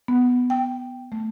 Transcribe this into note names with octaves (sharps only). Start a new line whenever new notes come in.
B3
G5
A3